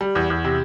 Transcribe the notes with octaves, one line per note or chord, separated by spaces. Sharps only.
G3
E2
E2
C3